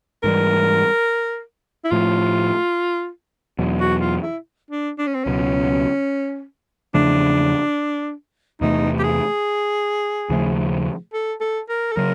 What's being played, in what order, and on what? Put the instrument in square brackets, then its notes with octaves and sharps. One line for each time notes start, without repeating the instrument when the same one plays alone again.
[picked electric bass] G#2 E3 G3 [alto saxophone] A#4
[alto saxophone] E4
[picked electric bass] A2 F3 A3 [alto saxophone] F4
[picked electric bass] E2 B2 F#3
[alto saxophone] F#4
F4
E4
D4
D4
C#4
C4
[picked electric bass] C#2 B2 F#3 [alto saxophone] C#4
[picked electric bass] E2 C#3 F3 A3 [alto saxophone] D4
[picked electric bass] E2 C3 E3 A3 [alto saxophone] D#4
[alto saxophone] G4
G#4
[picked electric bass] D#2 C#3 F3 A3
[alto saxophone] A4
A4
A#4
A4
[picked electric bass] C#3 F#3 [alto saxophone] A#4